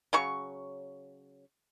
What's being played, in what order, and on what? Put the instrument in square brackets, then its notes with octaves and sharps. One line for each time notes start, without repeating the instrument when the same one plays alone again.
[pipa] C#3 F#3 C#6